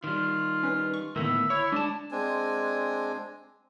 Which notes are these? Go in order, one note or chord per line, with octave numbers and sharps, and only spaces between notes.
D#3 G3 F4
C#4 B4
C#6
A2 D3 D#3 A#3 B3 E5
E4 C#5
G#3 D4 D5 A5
G#3 C4 D4 G#5